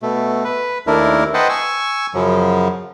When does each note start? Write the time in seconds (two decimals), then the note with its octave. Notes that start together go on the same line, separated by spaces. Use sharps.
0.02 B2 A3
0.44 B4
0.87 D#2 A3 D4 E4 A#4
1.34 B4 C5 D#5 F#5 G5 A5
1.49 G#5 C#6 E6
2.14 F#2 C#3 F3 F#3